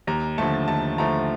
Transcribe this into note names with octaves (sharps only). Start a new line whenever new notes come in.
D#2 A#5
D3 F3 A3 A5
D#2 A5
D3 F3 A3 A#5